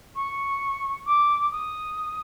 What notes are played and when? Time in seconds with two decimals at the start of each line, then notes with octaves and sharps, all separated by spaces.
0.15 C#6
1.05 D6
1.51 D#6